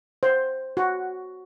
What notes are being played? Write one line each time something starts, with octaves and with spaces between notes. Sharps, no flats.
C5
F#4